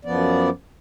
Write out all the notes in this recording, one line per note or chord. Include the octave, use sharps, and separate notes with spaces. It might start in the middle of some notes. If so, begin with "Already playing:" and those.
F#2 F3 B3 D5